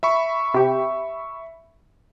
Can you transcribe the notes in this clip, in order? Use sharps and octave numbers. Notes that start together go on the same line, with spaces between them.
E5 B5 C#6
C3 G4